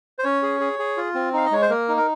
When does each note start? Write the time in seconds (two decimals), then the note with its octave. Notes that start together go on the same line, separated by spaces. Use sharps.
0.19 C5
0.24 C#4 C#5
0.43 G#4
0.60 G#4
0.79 G#4
0.97 F4
1.15 C4
1.33 D#4 F5
1.45 D#5
1.51 G#3 C#5
1.62 C5
1.70 A#3 A#4
1.89 D#4
1.97 A#4